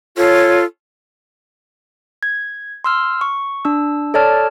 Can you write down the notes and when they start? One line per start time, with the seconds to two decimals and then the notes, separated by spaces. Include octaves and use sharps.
0.18 F4 A4 C#5
2.23 G#6
2.84 C6 E6 F6
3.21 C#6
3.65 D4 E6
4.14 A4 C#5 D5 A5 F6